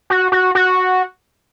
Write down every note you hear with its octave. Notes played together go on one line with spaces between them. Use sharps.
F#4
F#4
F#4